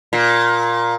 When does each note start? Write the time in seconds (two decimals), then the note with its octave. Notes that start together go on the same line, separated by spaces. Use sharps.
0.13 A#2